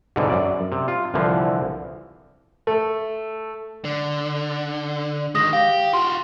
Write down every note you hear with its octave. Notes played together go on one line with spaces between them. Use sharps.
C2 G#2 B2 D3
F#2 D5
C3
F4
C2 D3 E3 F3
A3
D3
D#3 G#3 D#6 A#6
G4 F5
F4 F#4 C6